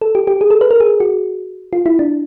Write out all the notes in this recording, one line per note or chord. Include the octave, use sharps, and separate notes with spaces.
A4
G4
G4
G#4
A4
B4
A#4
G#4
F#4
F4
E4
D4